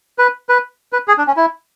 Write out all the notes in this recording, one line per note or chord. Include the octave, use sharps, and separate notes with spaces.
B4
B4
B4
G#4
D4
C#4
E4